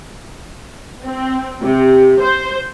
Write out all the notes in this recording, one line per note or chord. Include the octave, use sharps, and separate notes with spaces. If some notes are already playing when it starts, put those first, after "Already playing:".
C4
C3
C5